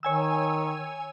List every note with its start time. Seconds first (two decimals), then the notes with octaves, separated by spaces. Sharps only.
0.03 D#3 C#5 G#5 E6